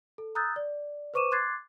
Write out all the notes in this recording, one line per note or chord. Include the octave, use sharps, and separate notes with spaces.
A4
A#5 D#6 E6 F#6 G6 A6
D5
B4 C5 C#6 D6 D#7 E7
C6 D6 F#6 G#6 A6 C7